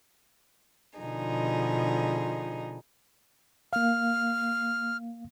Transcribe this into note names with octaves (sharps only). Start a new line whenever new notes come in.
B2 D3 F3 D#4 G#4
A#3 F5 F6